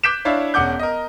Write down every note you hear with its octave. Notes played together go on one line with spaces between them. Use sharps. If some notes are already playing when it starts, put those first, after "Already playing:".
D6 F#6 G6 B6 D7 E7
D4 E4 C#5 D5 F5
E1 C#4 F#5 D6 G6
A#4 D#5